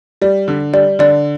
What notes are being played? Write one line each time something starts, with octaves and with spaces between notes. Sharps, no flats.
G3 D5
D3
G3 D5
D3 D5